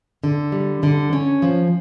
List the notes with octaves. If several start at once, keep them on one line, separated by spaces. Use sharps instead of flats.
D3
G3
D3
C#4
F3